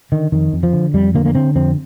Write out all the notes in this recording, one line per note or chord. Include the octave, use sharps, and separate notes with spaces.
D3 D#3
F2 D#3
F2
F3
D3
F2 G3
D3 A#3
A#3
D3 C4
F2 C4